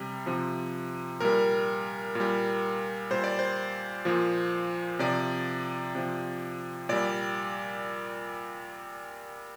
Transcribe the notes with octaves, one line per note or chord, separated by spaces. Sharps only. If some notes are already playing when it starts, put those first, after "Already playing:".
Already playing: C3 G3
C3 F3
A#2 G3 A#4
A#2 G3
A#2 G3 C5
D5
C5
A#2 F3
C3 F3 D5
C3 F3
A#2 G3 D5